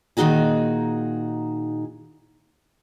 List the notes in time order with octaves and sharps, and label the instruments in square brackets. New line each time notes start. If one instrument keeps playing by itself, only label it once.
[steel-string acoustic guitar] A#2 D#3 B3 D#4 F#4 G#4